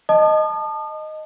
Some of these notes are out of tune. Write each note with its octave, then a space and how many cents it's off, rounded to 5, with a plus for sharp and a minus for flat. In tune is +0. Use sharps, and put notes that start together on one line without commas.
D#5 +0 A5 +0 D#6 -40